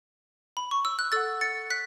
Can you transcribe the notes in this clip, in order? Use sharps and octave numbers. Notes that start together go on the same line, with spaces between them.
B5
C#6
E6
F#6
A4 F#5 E6 A6
A6 C#7
F#6 B6